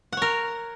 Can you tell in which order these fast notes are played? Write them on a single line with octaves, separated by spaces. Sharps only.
F#5 C#5 A#4